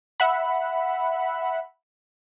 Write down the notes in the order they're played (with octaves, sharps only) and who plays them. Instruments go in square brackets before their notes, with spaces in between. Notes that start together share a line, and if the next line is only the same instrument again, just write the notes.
[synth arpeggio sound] E5 F#5 B5